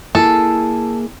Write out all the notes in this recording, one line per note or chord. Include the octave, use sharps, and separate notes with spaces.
A#3 E4 G#4 A4